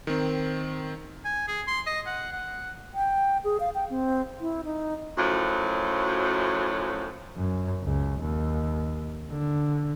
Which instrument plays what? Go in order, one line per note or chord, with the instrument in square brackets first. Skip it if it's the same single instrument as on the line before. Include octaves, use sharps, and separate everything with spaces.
[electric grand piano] D#3 C4
[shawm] G#5
G#4
C6
D#5
F#5
F#5
[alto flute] G5
G#4
F5
G5
C4
E4
D#4
[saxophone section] F#2 A2 F3 F#3
[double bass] F#2
C#2
D#2
D3